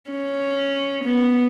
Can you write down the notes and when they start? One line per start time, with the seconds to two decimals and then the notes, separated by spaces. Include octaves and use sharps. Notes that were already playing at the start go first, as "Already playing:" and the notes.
0.10 C#4
1.04 B3